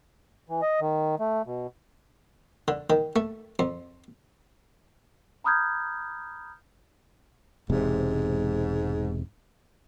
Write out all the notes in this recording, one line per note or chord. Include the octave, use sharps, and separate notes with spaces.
E3
D#5
D#3
A3
B2
D3
D#3
A3
F2
A#5 B5 D#6 F6 G6 G#6
E1 G#2 C3